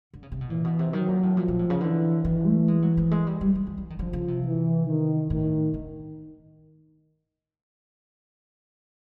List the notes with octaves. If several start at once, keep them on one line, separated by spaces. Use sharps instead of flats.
D3
C#3
C3
B2
A#2 E3
B2
C3
D#3 F#3
A#2
A2
A#2 F3
A#2
A2
C#3
D3 E3
D#3 E3
A3
G#3
F#3
F3
G#3
G3
G3
G3
F3
E3
D#3
D3 F3
C#3
C3
E3
D#3
A2 D#3
D3